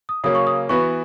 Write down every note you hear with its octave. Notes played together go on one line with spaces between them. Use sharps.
D#6
C#3 F#3 A#3 C#4 D#6
C#6
D#6
E3 B3 F#4 B4 C#6